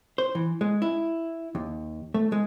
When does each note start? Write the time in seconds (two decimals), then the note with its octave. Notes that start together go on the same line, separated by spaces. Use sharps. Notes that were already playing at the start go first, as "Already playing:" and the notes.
0.18 C5
0.35 E3
0.61 G#3
0.82 E4
1.55 D#2
2.14 A3
2.32 G#3